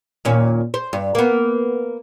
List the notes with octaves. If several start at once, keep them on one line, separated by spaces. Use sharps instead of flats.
D#2 A#2 C#4
C5
G2
A#3 B3